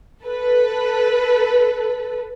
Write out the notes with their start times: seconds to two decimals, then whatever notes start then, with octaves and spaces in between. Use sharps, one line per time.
0.23 A4 B4